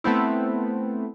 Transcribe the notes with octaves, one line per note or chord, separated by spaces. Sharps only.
A3 B3 C4 E4